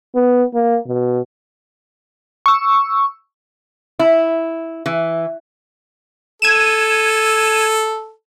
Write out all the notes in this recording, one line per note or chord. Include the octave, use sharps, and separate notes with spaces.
B3
A#3
B2
C#6 E6
E4
E3
A4 G#6 D#7 E7